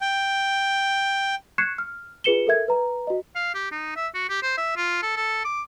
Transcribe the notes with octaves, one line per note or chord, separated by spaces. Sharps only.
G5
C#6 F#6 G#6 C7 C#7 E7
F6
F4 G#4 B4 C#7 E7 G7
A4 A#4 E5 G#6
B4 A#5
F#4 D#5
F5
G4
D#4
E5
F#4
G4
C5
E5
F4
A4
A4
D6